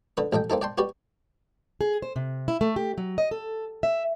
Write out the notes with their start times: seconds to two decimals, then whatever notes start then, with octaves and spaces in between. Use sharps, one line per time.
0.17 D3 B4 D#6
0.33 A1 A4 D#5 G5
0.50 A#3 C4 D#4 A4
0.61 D5 G5 A5 C6
0.78 F#4 G4 B4 D5
1.81 G#4
2.02 C5
2.16 C3
2.48 E4
2.61 A3
2.76 G4
2.98 F#3
3.18 D#5
3.31 A4
3.83 E5